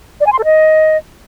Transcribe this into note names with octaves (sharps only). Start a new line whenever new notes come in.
D5
G#5
C6
A4
D#5